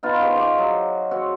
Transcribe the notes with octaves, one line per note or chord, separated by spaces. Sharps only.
B3 D#4 F4
G#4 C5 D#5 C#6
D#5 G#5 D6
F#3
C4 F#4 C#5